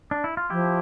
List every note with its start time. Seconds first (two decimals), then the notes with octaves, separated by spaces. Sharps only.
0.11 D4
0.24 E4
0.37 F4
0.50 F3 E4 G4